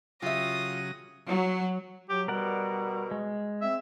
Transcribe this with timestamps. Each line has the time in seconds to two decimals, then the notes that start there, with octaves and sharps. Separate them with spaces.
0.22 C#3 F#3 F4 G4 E5 D#6 A#6
1.29 F#3
2.10 F#3 G4
2.28 B2 G3 A#4 D5 F#5
3.11 G#3
3.62 C4 E5